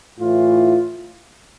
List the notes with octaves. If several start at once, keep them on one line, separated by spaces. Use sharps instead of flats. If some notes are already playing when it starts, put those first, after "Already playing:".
A2 E3 F4